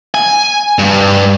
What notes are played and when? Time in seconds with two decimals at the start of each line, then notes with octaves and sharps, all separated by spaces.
0.14 G#5
0.79 G2